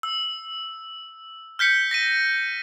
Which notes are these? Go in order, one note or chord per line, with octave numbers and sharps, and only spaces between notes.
E6
F6 G6 B6 C#7
A#6 B6 D#7